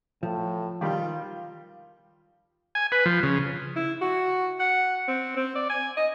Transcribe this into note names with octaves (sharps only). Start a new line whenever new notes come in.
A2 F3
D#3 G3 F4
G#5
B4
F3
C#3
E4
F#4
F#5
C4
C4
D5
G#5
D#5